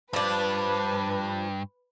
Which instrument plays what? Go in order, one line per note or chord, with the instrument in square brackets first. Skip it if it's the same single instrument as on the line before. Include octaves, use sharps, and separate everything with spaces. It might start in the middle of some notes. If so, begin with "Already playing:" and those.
[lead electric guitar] G2 [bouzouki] F3 D4 [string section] B4